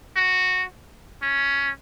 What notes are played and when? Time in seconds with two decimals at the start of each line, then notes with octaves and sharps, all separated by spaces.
0.16 F#4
1.22 C#4